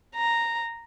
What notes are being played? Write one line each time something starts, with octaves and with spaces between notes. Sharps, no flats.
A#5